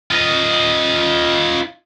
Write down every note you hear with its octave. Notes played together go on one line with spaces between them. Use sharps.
F4 D#5